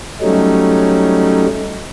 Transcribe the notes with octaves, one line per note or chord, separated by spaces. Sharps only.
F#3 G3 A3 C#4 D#4